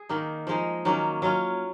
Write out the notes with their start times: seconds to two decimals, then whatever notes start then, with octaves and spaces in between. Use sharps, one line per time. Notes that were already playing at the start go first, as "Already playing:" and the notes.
Already playing: G#4
0.09 D#3 A#3 D#4
0.47 F3 G#3 D#4
0.85 D#3 F#3 A#3 C#4
1.22 F#3 C#4 F4